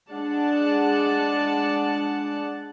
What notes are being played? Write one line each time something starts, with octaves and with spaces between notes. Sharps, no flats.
G#3 D4 D5 F#5 A5